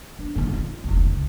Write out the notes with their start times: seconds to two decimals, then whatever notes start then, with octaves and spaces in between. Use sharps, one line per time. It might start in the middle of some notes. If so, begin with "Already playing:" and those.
0.19 D4
0.35 G2 D#3
0.53 F4
0.84 F1 C#2
1.07 C#2